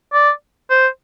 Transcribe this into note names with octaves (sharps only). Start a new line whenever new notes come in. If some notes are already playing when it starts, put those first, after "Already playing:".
D5
C5